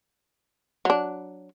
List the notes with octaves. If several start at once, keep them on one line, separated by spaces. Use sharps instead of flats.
F#3 D4